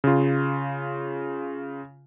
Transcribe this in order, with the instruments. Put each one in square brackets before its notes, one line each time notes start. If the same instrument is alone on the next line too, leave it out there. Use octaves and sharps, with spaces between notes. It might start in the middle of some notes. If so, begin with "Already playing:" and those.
[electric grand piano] C#3 F4